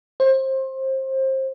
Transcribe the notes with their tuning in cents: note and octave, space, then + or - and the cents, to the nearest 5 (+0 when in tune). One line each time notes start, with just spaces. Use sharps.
C5 +25